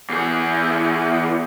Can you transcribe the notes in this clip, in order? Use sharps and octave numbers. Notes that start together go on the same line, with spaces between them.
E2 G#4